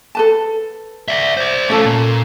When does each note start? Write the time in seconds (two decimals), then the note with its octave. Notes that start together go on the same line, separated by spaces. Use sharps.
0.15 A4 B4 A5
1.08 D5 E5
1.37 C5 D5
1.69 A3 C#4 F4 A4 A5
1.85 A#2